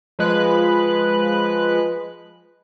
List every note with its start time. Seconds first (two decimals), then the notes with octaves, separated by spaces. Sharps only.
0.19 F3 G#3 B4 F#6